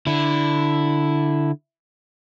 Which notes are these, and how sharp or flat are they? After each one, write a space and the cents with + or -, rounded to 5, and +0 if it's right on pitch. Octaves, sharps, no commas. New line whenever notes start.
D3 +0 E4 +0